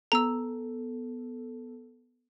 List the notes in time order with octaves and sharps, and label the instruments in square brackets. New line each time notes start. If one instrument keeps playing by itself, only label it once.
[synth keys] B3 A4 [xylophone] A#5 E6